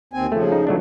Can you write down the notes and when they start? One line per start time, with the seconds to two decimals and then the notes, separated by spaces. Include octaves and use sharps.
0.13 D#2 C4 G#5
0.32 C#3 F3 A3
0.52 D#4
0.67 F#3 A3 D4